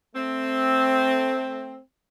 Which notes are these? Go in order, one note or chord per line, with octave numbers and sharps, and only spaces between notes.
A3 C4